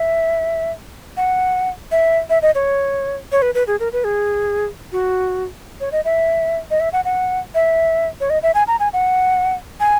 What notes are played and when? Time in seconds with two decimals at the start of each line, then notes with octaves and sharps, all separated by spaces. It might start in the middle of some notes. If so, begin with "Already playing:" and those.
Already playing: E5
1.17 F#5
1.91 E5
2.30 E5
2.42 D#5
2.55 C#5
3.32 C#5
3.42 B4
3.55 B4
3.67 G#4
3.80 A#4
3.93 B4
4.04 G#4
4.92 F#4
5.80 C#5
5.92 D#5
6.05 E5
6.71 D#5
6.80 E5
6.93 F#5
7.05 F#5
7.55 E5
8.20 C#5
8.30 D#5
8.43 E5
8.55 G#5
8.67 A#5
8.80 G#5
8.93 F#5
9.80 G#5